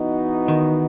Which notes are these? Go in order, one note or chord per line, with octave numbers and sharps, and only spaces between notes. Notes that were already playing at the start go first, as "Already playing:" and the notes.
Already playing: E3 B3 D#4 F#4
D#3